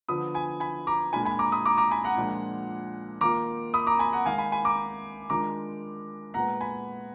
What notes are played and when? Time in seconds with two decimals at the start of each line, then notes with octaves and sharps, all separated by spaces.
0.08 D3 F3 B3 D4 F4 B5 D#6
0.34 G#5 B5
0.60 G#5 B5
0.87 A#5 D6
1.13 A#2 G#3 D4 F4 G#5 B5
1.25 G#5 B5
1.39 A#5 D6
1.52 B5 D#6
1.66 A#5 D6
1.78 A#5 D6
1.91 G#5 B5
2.04 F#5 A#5
2.17 A#2 F3 G#3 D4 F4
3.21 D#3 A#3 F4 A#5 D6
3.74 B5 D#6
3.87 A#5 D6
3.99 G#5 B5
4.12 F#5 A#5
4.25 D#3 G#3 D#4 F5 G#5
4.38 G#5 B5
4.52 G#5 B5
4.65 A#5 D6
5.30 D#3 G#3 D4 F4 A#5 D6
6.34 A#2 G#3 B3 F#5 A#5
6.61 G#5 B5